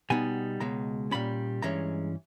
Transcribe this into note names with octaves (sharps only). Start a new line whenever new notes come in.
B2 G3 B3 D#4 G#5
C#2 B2 G#3 A#5
A#2 G3 C#4 B5
G2 E3 G#3 C#4 A#5